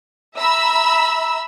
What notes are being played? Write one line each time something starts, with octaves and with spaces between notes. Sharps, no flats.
E5 A#5 B5 E6